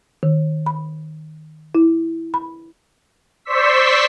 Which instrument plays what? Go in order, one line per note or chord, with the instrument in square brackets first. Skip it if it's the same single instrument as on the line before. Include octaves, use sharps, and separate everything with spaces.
[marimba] D#3
B5
E4
B5
[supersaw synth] C5 D5 C6 C#6 E6 B6